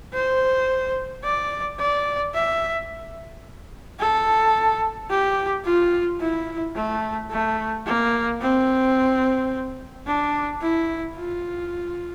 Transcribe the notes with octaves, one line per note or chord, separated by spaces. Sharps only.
C5
D5
D5
E5
A4
G4
F4
E4
A3
A3
A#3
C4
D4
E4
F4